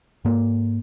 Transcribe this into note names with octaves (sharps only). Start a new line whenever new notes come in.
G#2 A#3